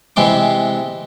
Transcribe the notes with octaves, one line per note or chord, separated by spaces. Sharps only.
C3 E3 G#3 C4 C6 D6